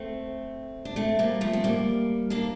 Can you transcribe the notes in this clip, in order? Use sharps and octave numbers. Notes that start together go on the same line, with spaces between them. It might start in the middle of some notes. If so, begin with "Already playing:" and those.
Already playing: A3 C4
D4
A3 C4
G3 A#3
F3 A3
C4
G3 A#3
A#3 D4